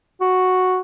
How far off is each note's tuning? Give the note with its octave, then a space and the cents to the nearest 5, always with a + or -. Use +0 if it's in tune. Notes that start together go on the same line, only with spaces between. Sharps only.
F#4 -5